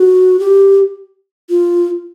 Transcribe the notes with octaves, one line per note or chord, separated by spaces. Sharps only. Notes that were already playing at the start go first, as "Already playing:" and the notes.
Already playing: F#4
G4
F4